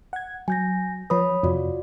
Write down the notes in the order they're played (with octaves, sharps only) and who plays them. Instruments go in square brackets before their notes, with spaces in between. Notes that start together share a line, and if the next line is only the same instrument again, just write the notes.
[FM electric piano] F#5 G#6
[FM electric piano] F#3 [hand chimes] G#5 G6 A#6
[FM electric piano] F3 B4 [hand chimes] C#5 B5 D#6
[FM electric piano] F2 C3 [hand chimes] F4 F#4 D5